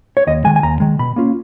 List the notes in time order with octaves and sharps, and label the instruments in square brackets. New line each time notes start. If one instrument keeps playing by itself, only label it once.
[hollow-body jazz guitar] C#5
D#2 D#5
D#3 G#3 G#5
G#5
D#2 A#5
D#3 G#3
B2 B5
A#3 C#4 F4